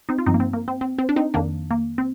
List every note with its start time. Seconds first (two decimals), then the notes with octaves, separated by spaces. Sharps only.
0.09 C4 D#4
0.18 F4
0.26 G2 F3 C4 D#4
0.34 A#3
0.40 C4
0.53 A#3
0.68 C4
0.81 C4
0.99 C4
1.09 D4
1.16 C4 D#4
1.34 F2 D#3 A#3 D4
1.71 A#3
1.98 C4